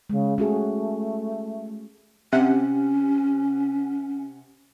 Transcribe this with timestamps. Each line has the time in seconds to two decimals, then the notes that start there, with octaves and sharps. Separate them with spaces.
0.10 C#3 G#3
0.38 A3 C#4 F#4 G#4
2.33 C3 C#4 F#5